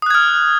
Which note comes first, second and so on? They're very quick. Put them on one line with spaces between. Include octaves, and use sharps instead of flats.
D#6 F#6 G#6 F6